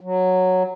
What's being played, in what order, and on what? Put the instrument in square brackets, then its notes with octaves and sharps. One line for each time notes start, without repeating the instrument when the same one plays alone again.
[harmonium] F#3